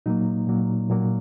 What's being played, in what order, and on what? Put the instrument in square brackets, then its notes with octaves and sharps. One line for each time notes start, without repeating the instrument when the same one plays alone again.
[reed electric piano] A#2 F#3 A#3 D#4
A#2 F#3 A#3
A#2 F#3 A#3